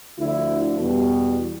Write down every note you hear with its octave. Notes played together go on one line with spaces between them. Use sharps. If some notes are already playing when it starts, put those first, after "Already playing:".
D2 D3 F3 E4
E2 B2 G3